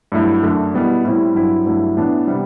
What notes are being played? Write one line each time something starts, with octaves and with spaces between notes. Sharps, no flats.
G2 F#3 A3 E4
F#2 D3 A3 D4
B2 G3 B3 E4
A2 G3 C4 E4
G2 F#3 C4 E4
G2 F#3 A3 E4
A2 E3 B3 D4
C3 G3 B3